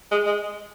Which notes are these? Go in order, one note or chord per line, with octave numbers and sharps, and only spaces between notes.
G#3
G#3